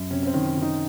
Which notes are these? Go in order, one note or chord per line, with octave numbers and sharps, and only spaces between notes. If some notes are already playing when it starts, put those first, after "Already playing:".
Already playing: F#2
C3 C#4
C#4
C4
D#3
C#4
D#3
D#4